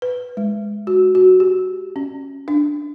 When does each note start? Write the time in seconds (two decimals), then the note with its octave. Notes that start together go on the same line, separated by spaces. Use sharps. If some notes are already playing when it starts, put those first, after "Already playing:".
0.02 B4
0.37 G#3
0.87 F#4
1.15 F#4
1.40 G4
1.96 C#4
2.48 D4